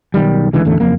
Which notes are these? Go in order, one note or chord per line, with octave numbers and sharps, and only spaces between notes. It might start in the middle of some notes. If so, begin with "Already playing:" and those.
B1 D#3 G3
C#2 D3 E3 G#3
A1 E2 D3 A3
F#1 F2 A#3